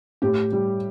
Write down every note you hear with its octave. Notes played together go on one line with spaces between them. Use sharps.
A2 G4
G3